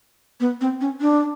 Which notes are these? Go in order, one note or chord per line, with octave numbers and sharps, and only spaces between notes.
B3
C4
C#4
D4